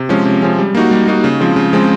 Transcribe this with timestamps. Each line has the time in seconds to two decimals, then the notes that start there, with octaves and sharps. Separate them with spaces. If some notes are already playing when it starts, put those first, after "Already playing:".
Already playing: C3
0.09 F3 G#3 C#4
0.25 C3
0.42 F3 G#3 C#4
0.59 G3
0.75 A#3 D#4 F#4
0.91 G3
1.08 A#3 D#4 F#4
1.24 C#3
1.40 F3 G#3 C4
1.56 C#3
1.73 F3 G#3 C4